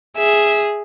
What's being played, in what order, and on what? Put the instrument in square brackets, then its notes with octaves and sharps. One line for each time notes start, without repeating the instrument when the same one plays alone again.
[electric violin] G#4 [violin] E5